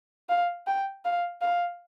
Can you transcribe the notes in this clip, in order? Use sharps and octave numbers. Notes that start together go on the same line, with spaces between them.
F5
G5
F5
F5